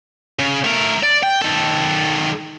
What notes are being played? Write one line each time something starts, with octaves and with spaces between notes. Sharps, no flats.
C#3
A3 A#4
D5
G5
D#3 A4